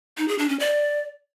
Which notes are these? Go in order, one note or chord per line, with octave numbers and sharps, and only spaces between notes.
D#4
G#4
D4
C#4
D5